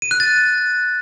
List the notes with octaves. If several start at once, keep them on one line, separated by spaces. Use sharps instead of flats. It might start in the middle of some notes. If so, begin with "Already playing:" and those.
D#7
F#6
A6